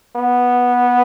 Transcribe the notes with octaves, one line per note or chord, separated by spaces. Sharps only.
B3